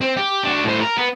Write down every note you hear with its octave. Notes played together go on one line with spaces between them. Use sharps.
C4
G4
D4 F#4
A2 C5
A#4
B3